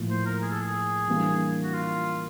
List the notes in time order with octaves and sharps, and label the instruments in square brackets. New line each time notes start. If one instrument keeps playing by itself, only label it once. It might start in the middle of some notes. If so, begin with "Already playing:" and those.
Already playing: [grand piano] A2 F3 A#3
[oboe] C5
A#4
G#4
A4
G#4
[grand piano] E3 G3 A#3 D4
[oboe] F#4
F4